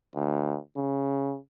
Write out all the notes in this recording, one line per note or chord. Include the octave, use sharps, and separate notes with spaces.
D2
C#3